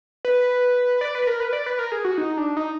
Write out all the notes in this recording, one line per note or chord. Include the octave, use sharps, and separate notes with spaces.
B4
D5
B4
A#4
B4
D5
B4
A#4
G#4
F#4
D#4
D4
D#4